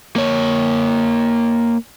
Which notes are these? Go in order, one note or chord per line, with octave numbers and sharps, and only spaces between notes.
A#3 C#5